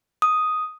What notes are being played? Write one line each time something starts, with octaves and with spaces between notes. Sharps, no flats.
D#6